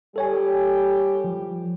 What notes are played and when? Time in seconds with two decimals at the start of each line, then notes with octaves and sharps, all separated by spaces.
0.16 G3 G4 A4 C#5 G#5
1.24 F3